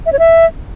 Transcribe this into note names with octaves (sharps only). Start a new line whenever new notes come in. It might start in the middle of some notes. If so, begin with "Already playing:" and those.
E5
C#5
E5